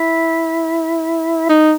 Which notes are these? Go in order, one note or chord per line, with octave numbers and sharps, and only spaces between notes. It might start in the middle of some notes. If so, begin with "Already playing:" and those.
Already playing: E4
D#4